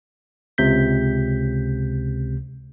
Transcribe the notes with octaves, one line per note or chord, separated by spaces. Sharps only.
C#2 C3 G6 B6